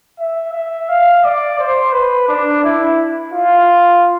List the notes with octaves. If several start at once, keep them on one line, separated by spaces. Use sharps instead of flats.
E5
E5
F5
D5
C5
B4
D4
E4
F4